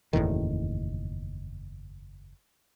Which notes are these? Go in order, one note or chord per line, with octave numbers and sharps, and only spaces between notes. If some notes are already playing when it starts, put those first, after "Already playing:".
F#1 E2 A2 D#3